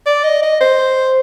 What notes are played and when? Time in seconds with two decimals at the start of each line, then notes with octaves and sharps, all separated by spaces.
0.06 D5
0.24 D#5
0.43 D#5
0.61 C5